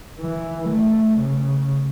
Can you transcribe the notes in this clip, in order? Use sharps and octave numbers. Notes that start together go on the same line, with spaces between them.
E3
A3
C#3